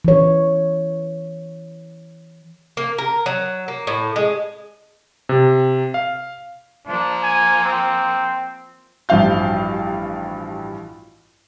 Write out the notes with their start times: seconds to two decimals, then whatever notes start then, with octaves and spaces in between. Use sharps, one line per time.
0.05 E3 C#5
2.77 A#3
2.98 A#4
3.26 F#3
3.68 A#3
3.87 A2
4.16 G#3
5.29 C3
5.94 F5
6.87 F3 A#3 D4
7.23 G#5
7.63 C4
9.09 A1 G2 F3 F#4 F5 G6